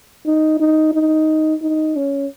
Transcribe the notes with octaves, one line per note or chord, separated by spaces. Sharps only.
D#4
D#4
D#4
D#4
C#4